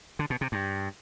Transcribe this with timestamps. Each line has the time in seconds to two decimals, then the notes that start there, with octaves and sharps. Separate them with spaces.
0.19 D3
0.30 B2
0.41 C3
0.52 G2